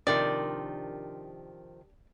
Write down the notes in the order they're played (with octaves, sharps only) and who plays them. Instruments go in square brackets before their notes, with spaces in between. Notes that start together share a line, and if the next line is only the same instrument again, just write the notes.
[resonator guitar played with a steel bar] C3 D#3 F3 [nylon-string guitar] D4 G4 A#4 [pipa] D5